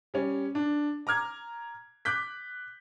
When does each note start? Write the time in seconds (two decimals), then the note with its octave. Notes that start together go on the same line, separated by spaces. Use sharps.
0.14 G3 C#4
0.55 D4
1.07 A#5 D6 F6 G#6
2.05 D6 F#6 G6 B6